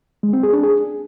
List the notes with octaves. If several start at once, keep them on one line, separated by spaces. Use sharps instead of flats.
G#3
C4
G#4
D4
G#4